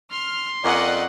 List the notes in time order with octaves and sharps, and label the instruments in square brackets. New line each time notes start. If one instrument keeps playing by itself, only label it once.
[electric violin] C6 [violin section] F6
[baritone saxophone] F2 [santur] A#3 C#4 [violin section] D5 D#5 F#5